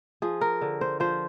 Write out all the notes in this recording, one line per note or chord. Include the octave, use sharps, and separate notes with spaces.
F3 G#4
A#4
D3
C5
F3 C5